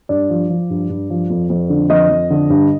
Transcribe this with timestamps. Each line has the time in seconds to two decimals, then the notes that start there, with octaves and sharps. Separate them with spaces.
0.09 G2 D5
0.30 F3
0.50 F3
0.70 G2
0.90 G2
1.10 F3
1.30 F2
1.50 F2
1.70 D3
1.89 F2 D#5
2.10 F2
2.30 D3
2.50 G2